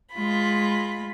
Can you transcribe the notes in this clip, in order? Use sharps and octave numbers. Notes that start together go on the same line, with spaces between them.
G#3 F4 B5